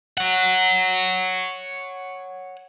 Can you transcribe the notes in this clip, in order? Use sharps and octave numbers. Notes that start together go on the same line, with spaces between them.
C#5 F#5